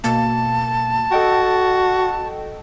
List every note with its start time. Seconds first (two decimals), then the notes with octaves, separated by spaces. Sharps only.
0.04 B2 A#3 A5
1.12 F#4 A4 D#5 G5